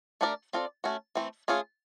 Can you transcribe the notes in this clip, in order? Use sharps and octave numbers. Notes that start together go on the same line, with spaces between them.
A3 D4 G4 A#4 D5
C4 F4 A4 D5
A3 C#4 F#4
E3 A3 C4
A3 C#4 F4 G#4